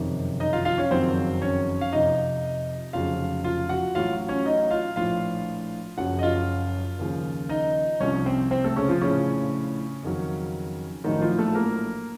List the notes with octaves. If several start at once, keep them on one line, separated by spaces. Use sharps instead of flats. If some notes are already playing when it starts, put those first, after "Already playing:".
Already playing: F#1 F2 C3 D#3
D#4 D#5
F4 F5
F4 F5
C#4 C#5
F#1 F2 D#3 F#3 C4 C5
C#4 C#5
F5
F2 C3 F3 D#4 D#5
F1 F2 C#3 F#3 F4 F5
F4 F5
F#4 F#5
A1 A2 F#3 F4 F5
C#4 C#5
D#4 D#5
F4 F5
A#1 A2 F3 F4 F5
F#1 F#2 C#3 F3 F#4 F#5
D#5
F4 F5
D#2 C#3 F3
D#4 D#5
C2 C3 F3 C#4 C#5
C4 C5
C4 C5
A3 A4
C#3 C#4
F3 F4
A#1 A2 C#3 F3 C#4
F2 D#3 F#3
A#1 A2 D#3 F#3 D#4
F3 F4
A3 A4
A#3 A#4